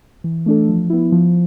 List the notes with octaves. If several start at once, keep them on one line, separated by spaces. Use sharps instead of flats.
E3
A3 D4 A4
F3
B3 E4
F3